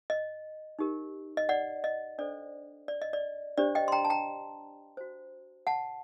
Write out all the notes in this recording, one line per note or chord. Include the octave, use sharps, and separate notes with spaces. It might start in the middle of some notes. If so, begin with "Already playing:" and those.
D#5
D#4 G4 A#4
D#5
D5 F#5
D#5
D4 A4 C5 D5
D5
D#5
D5
D4 G4 C5 D5
D#5 G5
C6
G5 A#5
A5
G5 A#5
F#4 C5
F#5 A5